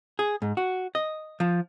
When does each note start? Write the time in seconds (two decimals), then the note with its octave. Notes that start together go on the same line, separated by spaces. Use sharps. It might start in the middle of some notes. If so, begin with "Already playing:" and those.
0.19 G#4
0.42 G#2
0.57 F#4
0.95 D#5
1.40 F3